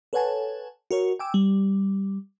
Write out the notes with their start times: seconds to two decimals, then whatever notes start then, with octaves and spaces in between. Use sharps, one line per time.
0.13 A4 B4 C#5 F#5 G#5 A5
0.91 F#4 A#4 C#5
1.19 G5 G#5 D6 E6
1.34 G3